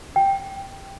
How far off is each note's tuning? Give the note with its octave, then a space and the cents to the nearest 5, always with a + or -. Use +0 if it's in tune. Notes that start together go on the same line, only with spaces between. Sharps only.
G5 +0